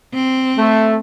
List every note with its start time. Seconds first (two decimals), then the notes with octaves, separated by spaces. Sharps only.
0.13 C4
0.58 A3